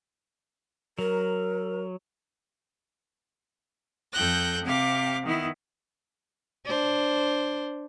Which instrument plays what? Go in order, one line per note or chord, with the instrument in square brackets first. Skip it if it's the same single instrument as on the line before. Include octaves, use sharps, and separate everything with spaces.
[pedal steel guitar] F#3 [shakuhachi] A#4
[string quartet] F2 A4 G5 F#6 G6 A#6
C3 G4 F5 D6
D#3 B3 E4
[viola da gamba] D4 C5